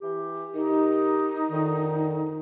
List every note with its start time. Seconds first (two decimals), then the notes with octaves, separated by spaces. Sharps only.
0.02 E3 G4
0.55 D#3 D#4 G4
1.51 F2 D3 D#3